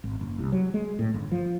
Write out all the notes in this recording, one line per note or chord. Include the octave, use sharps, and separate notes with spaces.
G#1
F#1
C2
F#3
G#3
A2
G1
F3